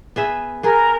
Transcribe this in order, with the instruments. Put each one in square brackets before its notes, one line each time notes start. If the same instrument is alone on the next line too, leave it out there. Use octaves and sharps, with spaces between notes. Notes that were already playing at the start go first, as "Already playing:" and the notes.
[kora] B3 G#4 E5
[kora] B3 G#4 [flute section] A#4